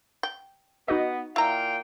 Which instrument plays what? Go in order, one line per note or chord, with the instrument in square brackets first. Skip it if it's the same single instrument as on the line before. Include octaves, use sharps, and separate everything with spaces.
[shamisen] G5
[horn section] B3 [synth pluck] D#4 F#4 D#5
[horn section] A#2 F5 G5 [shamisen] E4 A#5